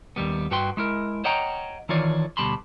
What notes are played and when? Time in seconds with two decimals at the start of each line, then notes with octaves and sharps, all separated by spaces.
0.16 D#2 G3 B3
0.51 G2 F#4 B4 G5 C6
0.77 G#3 E4 A#4
1.24 C5 C#5 D#5 F#5 G5 A#5
1.89 D#3 E3 F4 C#5 D5
2.37 D2 B2 G3 A5 B5 C6